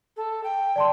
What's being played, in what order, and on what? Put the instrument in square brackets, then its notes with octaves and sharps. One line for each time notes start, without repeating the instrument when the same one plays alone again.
[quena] A4
G5
[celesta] D5 A5 C6